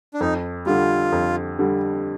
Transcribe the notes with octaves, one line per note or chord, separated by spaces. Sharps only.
D4
F2 D#4
D3 G3 F4
F2
D3 G3